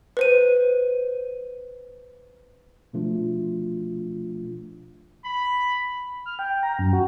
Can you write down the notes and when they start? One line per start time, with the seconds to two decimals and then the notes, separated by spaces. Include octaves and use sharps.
0.17 B4 C5 D#7
2.93 B2 F3 A3 D4 F4
5.25 B5
6.26 F6
6.39 G5
6.63 A#5
6.79 F#2
6.93 F#4